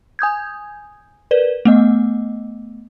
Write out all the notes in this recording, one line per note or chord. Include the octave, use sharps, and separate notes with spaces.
G#5 D#6 G6 G#6
A#4 B4 D5
A3 B3 D#5